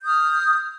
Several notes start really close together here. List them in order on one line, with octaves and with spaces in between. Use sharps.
G6 D#6 F6